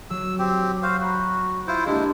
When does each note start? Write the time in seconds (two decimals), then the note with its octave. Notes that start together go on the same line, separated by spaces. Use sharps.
0.10 F#3 E6
0.39 C4 G4
0.83 F#4 C5 F5
1.00 F#4 A#5 B5 G6
1.67 E4 F4 C5
1.86 G#3 A#3 D4 E4 G4